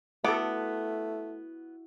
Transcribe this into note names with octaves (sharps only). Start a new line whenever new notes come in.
A3 B3 E4 F#4 A4 D6